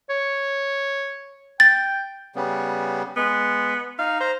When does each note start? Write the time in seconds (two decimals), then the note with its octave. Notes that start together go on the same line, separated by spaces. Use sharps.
0.09 C#5
1.60 G5 A6
2.35 C#3 G3 B3
3.17 G#3 B3
3.99 D#4 F5
4.20 C5 A#5